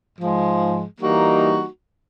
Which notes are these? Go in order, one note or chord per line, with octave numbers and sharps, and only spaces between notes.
G#2 F3 G#3
E3 G3 A#3 D#4 F#4